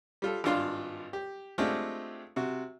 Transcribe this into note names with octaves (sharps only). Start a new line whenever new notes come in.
G3 F4 A4
G#1 G2 D4 F4 F5 C6
G4
G#3 A3 C4 D4 F4 G4
C3 F#4